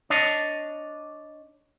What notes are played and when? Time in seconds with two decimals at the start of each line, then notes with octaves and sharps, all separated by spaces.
0.10 D4 C#5 D#5 A5